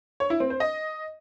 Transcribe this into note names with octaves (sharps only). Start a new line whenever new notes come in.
C#5
E4
C4
C5
D#5